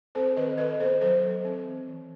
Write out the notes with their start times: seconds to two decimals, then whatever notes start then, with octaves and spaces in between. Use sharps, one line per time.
0.15 C4 A4 C5
0.37 D#3 B4 D#5
0.58 D#3 B4 D#5
0.80 B3 A4 C5
1.01 F#3 A4 C5
1.23 F#3
1.45 C4
1.66 E3
1.88 E3